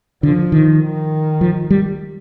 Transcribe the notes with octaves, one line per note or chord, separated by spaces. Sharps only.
D3 F3
D#3
D#3
F3
G3